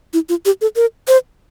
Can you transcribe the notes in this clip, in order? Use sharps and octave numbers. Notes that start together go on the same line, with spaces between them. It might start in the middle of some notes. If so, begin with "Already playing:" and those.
E4
F4
G4
A4
A#4
C5